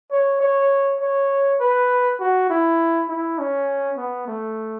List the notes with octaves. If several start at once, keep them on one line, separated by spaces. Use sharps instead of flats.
C#5
C#5
C#5
B4
F#4
E4
E4
C#4
B3
A3